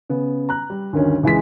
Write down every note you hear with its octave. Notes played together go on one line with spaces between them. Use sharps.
C#3 B3
A#5 F#6
G3
D2 G2 D#3 C#4
C#2 E3 G#3 B6